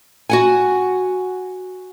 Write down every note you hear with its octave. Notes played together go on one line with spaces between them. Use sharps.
F#4 F#5 G#5